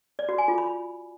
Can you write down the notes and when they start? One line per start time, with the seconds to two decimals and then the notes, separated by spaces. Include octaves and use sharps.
0.19 D5
0.29 F#4
0.38 G#5
0.48 F4
0.58 B5